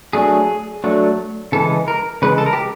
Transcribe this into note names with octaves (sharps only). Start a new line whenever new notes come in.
F#3 A3 D4 G#4
F#3 A3 D4
C#3 E3 G#3 A4
A#4
C#3 E3 G#3 B4
A4
A#4
G4